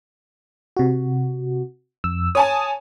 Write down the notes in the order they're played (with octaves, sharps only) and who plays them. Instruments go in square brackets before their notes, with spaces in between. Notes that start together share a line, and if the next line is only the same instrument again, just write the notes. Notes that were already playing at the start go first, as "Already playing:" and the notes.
[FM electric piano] C3 F#4
F2 E6
[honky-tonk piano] C#5 G#5 A5 [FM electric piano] D#6